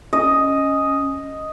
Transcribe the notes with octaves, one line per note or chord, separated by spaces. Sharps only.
C#4 D#5